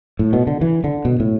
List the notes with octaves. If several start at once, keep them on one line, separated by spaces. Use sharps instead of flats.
A2
B2
D3
E3
D3
B2
A2